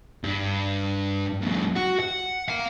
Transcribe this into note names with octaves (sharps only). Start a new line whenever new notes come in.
G2
F#2 A#2
F#4
F#5
F5 A#5